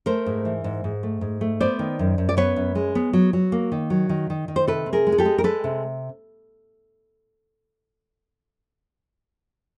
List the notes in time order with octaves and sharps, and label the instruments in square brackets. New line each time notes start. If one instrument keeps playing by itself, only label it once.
[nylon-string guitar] A3 A#4 C5
G#2
E3
G#2
G#2
A3
G#2
A3
B3 C5 D5
D#3
F#2
F#2
D5
B3 B4 C#5
F#2
G#3
B3
F#3
F#3
A#3
D#3
F#3
D#3
D#3
D#3
C5
C3 A4 B4
C4
G#4 A#4
G#3
G#4
G4 A4
G#3
A#4
G#3 A4 B4
C3